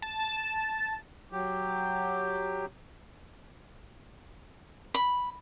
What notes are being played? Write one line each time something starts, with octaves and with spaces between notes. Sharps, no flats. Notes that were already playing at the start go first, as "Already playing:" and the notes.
A5
F#3 G4
B5